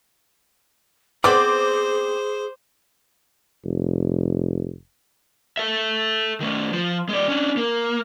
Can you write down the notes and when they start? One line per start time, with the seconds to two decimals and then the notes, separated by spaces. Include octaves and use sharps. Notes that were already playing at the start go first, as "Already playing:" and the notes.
1.24 B3 C4 G#4 C5 D5 D6
3.64 F1
5.57 A4 E5
6.40 D#3 A3
6.73 F3
7.09 G#3 D5
7.28 C#4 D4
7.57 A#3